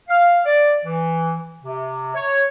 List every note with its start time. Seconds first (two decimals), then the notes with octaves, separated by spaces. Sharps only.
0.09 F5
0.46 D5
0.85 E3
1.63 C3
2.15 C#5